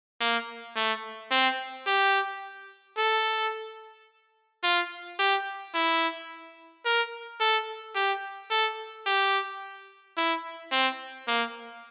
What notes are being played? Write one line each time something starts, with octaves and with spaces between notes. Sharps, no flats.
A#3
A3
C4
G4
A4
F4
G4
E4
A#4
A4
G4
A4
G4
E4
C4
A#3